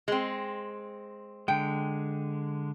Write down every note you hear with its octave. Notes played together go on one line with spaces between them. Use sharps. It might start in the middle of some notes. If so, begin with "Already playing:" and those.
G#3 C4
D3 G#3 G5